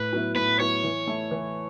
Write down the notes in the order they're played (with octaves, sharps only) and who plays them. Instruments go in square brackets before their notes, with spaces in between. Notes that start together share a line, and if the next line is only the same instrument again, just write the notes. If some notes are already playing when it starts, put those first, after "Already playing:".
Already playing: [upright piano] A2 [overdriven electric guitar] B4
[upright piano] F#3 B3 E4
[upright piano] A2 [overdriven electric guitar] B4
[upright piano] F#3 B3 E4 [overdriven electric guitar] C#5
[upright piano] E3
A3 E4
E3